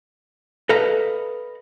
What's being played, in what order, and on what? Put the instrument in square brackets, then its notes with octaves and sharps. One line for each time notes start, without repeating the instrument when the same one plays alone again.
[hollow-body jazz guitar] A4 B4 D#5 F5 A#5